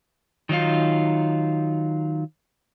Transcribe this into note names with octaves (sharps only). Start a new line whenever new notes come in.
D#3 F#3 D#4 F4